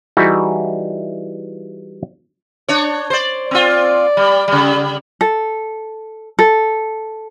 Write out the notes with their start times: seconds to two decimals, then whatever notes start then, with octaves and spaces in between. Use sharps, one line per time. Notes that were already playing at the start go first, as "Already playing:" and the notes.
0.17 E3 G3 D#4 E4 F#4 G#4
2.69 D4 C#5
3.10 C5 D5
3.51 C4 F4 D5
4.17 G3
4.48 C#3 G3
5.21 A4
6.39 A4